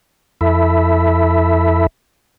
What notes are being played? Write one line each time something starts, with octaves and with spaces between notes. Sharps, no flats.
F2 E4 A4 E5 B5